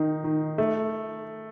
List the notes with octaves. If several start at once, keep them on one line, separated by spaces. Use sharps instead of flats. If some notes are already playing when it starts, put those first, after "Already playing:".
Already playing: D#3 D#4
D#3
A3